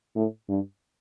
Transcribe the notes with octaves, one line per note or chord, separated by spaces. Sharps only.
A2
G2